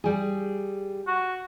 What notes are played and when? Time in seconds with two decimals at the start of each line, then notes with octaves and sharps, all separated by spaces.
0.04 G3 G#4
1.07 F#4